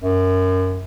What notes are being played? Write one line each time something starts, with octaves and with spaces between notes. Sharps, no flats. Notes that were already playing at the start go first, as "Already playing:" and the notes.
F#2